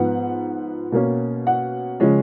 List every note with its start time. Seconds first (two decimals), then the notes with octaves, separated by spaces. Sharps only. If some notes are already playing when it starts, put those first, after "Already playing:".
Already playing: G#2 F3 B3 F#5
0.92 B2 A#3 C#4
1.47 F#5
2.00 C#3 F3 G#3 C#4